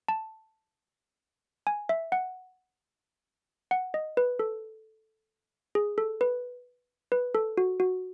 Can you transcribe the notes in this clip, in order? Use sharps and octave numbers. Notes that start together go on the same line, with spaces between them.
A5
G#5
E5
F#5
F#5
D#5
B4
A4
G#4
A4
B4
B4
A4
F#4
F#4